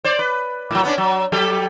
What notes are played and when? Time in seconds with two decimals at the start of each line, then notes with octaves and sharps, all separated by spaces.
0.04 C5 D5
0.19 B4
0.71 A2 F#3
0.83 B3 C#4 D4
0.98 F#3
1.32 F#3 G4 A4